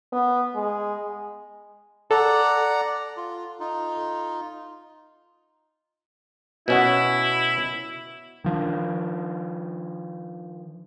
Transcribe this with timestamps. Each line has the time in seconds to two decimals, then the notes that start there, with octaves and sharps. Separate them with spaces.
0.12 B3
0.55 G#3
2.11 A4 D5 F#5 A#5
3.17 F4
3.60 D#4 F4
6.68 B2 C#4 E4 F#4
8.44 D#3 F3 D4